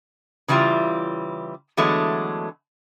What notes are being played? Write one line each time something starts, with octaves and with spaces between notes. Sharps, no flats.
C#3 E3 G3 E4 F4
D3 E3 F#3 G#3 A3 B3